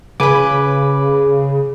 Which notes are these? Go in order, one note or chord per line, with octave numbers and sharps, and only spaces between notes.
C#3 B4 G#5 B5 D6